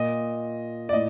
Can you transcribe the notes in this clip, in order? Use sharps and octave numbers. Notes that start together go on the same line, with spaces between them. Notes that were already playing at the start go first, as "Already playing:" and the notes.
Already playing: A#2 D#5
D5
A2 D#5